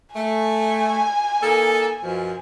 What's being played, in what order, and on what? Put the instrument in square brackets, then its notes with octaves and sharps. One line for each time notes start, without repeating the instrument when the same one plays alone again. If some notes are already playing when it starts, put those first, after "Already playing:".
[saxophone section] A3 [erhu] G#5
[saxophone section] A#3 D#4 A4
F#2 B2 F3